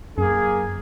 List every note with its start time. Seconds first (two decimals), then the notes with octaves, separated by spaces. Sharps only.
0.18 F#2 A#3 G#4